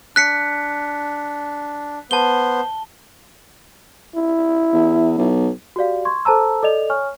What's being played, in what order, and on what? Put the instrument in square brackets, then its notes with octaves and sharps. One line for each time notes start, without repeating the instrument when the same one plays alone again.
[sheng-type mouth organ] D4 [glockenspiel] F#6 B6 C#7
[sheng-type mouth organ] B3 C5 [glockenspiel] A5 G7
[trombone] E4
[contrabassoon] E2
B1
[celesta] F#4 G4 D5 F5
C6 C#6 G#6
A4 C5 A5 A#5 E6
A4 D5 D#5 F7
C#5 G#5 C#6 F6